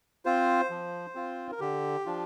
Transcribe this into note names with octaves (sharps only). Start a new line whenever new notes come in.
C4 F4 C5
F3
C4 F4
A#4
D3 G4
F3 D4 F4